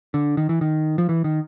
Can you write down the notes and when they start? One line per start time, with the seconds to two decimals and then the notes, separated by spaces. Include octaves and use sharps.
0.14 D3
0.37 D#3
0.49 E3
0.61 D#3
0.98 F3
1.09 E3
1.24 D#3